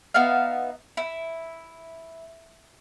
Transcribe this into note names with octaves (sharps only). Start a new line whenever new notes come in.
B3 D#4 E5 F5
E4